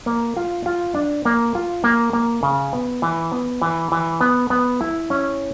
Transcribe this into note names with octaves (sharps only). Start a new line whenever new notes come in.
A#3
F4
F4
D4
A#3
F4
A#3
A#3
C#3
B3
E3
B3
E3
E3
B3
B3
E4
C#4